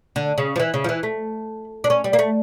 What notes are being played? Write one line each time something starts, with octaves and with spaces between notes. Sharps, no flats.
D3
C#3
F3
E3
C#3
F3
E3
A3
D4
C#4
G3
A#3
A3